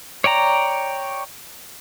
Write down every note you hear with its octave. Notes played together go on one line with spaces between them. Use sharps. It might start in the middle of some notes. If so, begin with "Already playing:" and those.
C#5 D5 G5 A#5